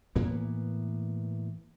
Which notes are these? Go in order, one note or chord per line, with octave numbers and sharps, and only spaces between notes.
A2 E3 A#3 B3